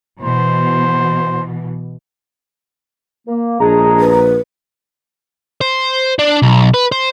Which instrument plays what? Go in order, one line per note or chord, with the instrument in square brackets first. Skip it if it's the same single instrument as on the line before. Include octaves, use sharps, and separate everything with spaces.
[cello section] B2 E3 [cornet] C5
[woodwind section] A#3
[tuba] A#1 [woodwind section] G#3 D4 G#4 [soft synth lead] A#5
[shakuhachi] B4
[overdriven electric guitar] C5
D4
B1
B4
C5